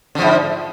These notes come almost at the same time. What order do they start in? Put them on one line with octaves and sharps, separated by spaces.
D3 F3 G#2